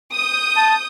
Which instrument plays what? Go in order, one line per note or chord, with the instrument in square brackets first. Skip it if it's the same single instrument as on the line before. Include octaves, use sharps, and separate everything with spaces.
[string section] D#6 G6
[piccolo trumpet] A5